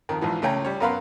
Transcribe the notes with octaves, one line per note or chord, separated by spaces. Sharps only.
F2 D#3
A#1 G#2 E3 F3
C#2 A3 C#4 G5 G#5 A#5
G3 C#5
F#2 B3 A#4 F5 B5 C6